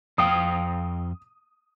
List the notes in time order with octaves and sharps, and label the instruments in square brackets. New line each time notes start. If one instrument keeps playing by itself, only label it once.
[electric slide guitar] F2 F5 G5 [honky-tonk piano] D#6